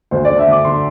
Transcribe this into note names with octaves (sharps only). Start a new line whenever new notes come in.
D2 C5
D3 D5
E5
D2 D6
D3 C6